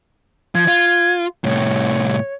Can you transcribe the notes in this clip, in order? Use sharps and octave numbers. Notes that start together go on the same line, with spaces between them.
F3 G#6
F4
C2 A2 C#5